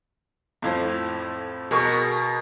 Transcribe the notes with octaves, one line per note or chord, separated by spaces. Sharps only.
F2 A2 F3
B2 G#4 A#4 C#6